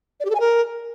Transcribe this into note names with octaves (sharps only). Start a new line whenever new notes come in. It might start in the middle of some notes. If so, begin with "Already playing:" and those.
D5
G4
A4
G#5
A#4